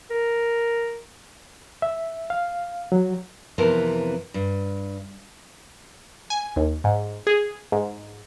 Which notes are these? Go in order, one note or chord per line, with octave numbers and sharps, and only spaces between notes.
A#4
E5
F5
F#3
F2 C3 E3 B3 A#4 A5
G2
G#5
D#2
G#2
G#4
G#2